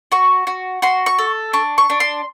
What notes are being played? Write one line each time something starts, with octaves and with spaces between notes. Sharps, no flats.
F#4 C#6
F#4
F#4 C6
C#6
A4
D4 C#6
C#6
D4
C6